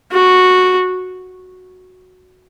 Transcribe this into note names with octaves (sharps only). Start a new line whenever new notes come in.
F#4